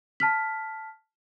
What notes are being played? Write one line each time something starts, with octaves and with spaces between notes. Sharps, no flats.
A5 F6 B6